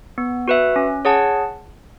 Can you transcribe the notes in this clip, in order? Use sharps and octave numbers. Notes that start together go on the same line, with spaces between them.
B3
F#4 B4 E5
C#4
G#4 C#5 F#5 A5